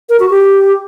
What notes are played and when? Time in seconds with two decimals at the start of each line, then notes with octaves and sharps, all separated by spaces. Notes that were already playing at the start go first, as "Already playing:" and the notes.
0.09 A#4
0.20 F#4
0.30 G4